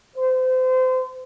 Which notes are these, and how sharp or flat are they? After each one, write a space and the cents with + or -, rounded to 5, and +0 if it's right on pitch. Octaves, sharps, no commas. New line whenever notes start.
C5 -30